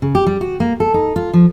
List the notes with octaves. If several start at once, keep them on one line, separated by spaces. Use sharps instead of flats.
C#3
G4
G3
F#4
A#3
A4
D#4
F4
F3